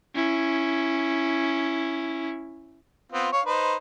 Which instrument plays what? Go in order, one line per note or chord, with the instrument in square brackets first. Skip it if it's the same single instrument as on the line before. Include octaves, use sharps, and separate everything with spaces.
[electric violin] C#4 E4
[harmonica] B3 C4 F4
C#5 F5
D#4 B4 C5